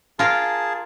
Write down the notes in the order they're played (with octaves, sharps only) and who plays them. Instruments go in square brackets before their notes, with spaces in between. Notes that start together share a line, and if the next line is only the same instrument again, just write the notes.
[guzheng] F4 A#4 F5 [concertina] G#4 A5